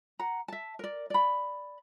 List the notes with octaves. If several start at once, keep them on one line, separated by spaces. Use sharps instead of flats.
F#5 A#5
E5 A5
A#4 D5
D5 B5